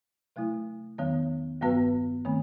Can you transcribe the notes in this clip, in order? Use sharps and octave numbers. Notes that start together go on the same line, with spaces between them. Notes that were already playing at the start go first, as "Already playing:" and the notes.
C3 F#3 A3 E4
E2 D#3 F#3 B3
G2 F#3 B3 F#4 B4
D#3 A3 C4